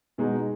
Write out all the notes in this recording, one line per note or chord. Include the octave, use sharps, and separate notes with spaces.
B2 G#3 D#4